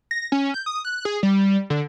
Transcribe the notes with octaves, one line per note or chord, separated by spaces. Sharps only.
A#6
C#4
G6
D#6
F#6
G#4
G3
D3